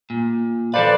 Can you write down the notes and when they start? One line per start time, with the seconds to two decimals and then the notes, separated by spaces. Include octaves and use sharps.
0.10 A#2
0.74 F3 F4 A4 B4 C5 D5